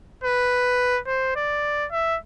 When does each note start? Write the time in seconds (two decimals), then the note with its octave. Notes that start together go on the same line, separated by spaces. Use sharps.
0.24 B4
1.07 C5
1.36 D5
1.92 E5